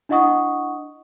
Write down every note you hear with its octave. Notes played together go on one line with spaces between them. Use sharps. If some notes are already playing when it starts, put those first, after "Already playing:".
D4 E4 D#5 F#5 C#6 D#6